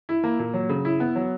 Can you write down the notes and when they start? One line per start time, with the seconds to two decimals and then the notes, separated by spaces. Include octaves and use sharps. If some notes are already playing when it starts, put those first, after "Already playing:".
0.09 E4
0.24 A#3
0.39 A#2
0.54 F#3
0.69 C#3
0.85 E4
1.00 B3
1.15 F#3